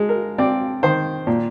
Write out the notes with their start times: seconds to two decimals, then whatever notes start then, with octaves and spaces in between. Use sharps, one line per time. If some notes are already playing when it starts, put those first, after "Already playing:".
Already playing: G#3
0.09 A#4
0.38 C4 D5
0.83 D#3 C5
1.27 A#2